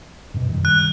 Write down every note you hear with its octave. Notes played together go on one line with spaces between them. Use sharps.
F#2 B2
F#2 D#3 G3
F#6